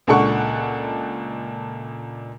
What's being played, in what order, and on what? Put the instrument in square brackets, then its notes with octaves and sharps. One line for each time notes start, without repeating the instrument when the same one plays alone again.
[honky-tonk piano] C#2 A#2 D4 A4 F#5 C#6